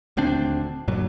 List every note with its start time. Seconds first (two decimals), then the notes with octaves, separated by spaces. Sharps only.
0.17 D#1 D2 C4 D4
0.88 G1 G2 A#2 F#3